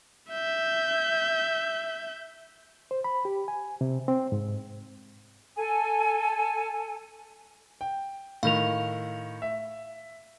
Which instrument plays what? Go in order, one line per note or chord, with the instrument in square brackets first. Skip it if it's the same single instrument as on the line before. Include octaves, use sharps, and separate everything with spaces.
[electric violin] E5 G6
[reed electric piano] C5
B5
G4
G#5
C3
C4
G#2
[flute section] A4 G#5
[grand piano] G5
[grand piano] A2 D#3 [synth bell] F5 F7
[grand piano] E5